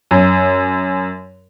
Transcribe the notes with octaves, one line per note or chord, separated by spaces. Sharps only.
F#2